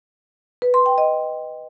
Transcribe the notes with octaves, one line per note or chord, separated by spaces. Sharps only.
B4
C6
G5
D#5